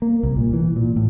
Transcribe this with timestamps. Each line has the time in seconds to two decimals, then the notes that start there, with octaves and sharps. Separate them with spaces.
0.02 A#3
0.23 C2
0.36 A#2
0.53 E3
0.76 A#2
0.96 A2